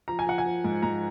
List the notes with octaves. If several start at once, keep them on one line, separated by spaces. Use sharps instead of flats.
F3 A#5
G#5
F3 F#5
G#5
F3
G#2
G#2 A#5